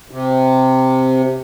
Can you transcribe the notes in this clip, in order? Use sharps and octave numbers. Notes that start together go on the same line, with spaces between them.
C3